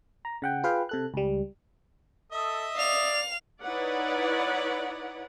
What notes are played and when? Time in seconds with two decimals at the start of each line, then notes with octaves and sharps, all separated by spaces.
0.25 A#5
0.42 C#3 F#5 G5
0.63 F4 G#4 B4 F5 G5
0.89 C3 A4 F#6
1.14 C#2 G3
2.32 A4 D#5 E5 D#6
2.76 D5 F5 F7
3.61 D#4 E4 B4 C#5 D5 F#5